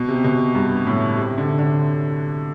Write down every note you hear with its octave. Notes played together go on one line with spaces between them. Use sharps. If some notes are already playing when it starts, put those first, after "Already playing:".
Already playing: B2
C3
B2
G2
A2
C3
D3
D3